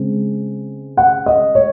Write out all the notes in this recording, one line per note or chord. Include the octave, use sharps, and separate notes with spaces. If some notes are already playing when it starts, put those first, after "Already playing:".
Already playing: C#3 G#3 C4
F#5
D#5
C#5